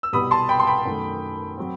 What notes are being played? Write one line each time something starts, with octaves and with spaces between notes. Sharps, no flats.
E6
C2 B2 G3 B3 B5 D#6
A5 C6
G5 B5
C6
G5 B5
F#2 D#3 A3
F#3 C4